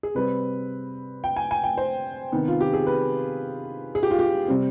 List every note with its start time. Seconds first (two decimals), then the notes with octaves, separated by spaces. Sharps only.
0.03 G#4
0.15 C3 G3 C4 B4
1.24 G5
1.37 G#5
1.51 G#5
1.64 G5
1.77 C5
2.32 C3 D#3 B3
2.48 F4
2.61 G4
2.73 G#4
2.87 B4
3.95 G#4
4.03 G4
4.11 F4
4.19 G4
4.48 C3 G3 C4